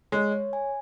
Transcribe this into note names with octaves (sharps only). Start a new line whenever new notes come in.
G#3 C#5
C#5
G#5